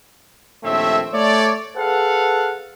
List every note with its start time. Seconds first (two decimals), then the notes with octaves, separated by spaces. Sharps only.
0.63 A#1 D#2 A3 C4 C#5 E5
1.12 A3 C#5 D5
1.76 G#4 A4 B4 F5 F#5